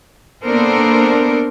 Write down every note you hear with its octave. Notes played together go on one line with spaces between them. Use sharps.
A#3 B3 D4 A4 A#4 C5